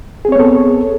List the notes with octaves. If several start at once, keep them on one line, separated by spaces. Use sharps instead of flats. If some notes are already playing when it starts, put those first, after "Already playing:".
B3 C4 G#4 A4 C#5